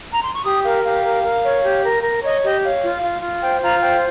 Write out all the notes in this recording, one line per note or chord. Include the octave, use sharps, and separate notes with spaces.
A#5
C6
C#6
G4 D#6
A#4 F5
G4 F5
A#4
A#4
C#5
G4
A#4
A#4
C#5 D#5
G4 D#5
C#5 F5
F4
F4
F4
C5 G5
F4 A#5
C5 G5